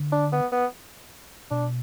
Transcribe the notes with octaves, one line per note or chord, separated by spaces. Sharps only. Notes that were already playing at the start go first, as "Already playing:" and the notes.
Already playing: D3
D4
B3
B3
B2 D4